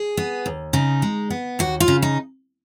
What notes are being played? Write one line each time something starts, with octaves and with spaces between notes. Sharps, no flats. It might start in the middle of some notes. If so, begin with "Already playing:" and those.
Already playing: G#4
B3
D#2
C#3 D#4
G#3
B3
D#2 F#4
F4
C#3
D#4